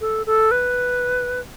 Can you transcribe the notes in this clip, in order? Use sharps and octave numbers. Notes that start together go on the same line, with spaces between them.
A4
A4
B4